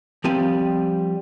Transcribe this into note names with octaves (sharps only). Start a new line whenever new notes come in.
F3 G3 C4 G#5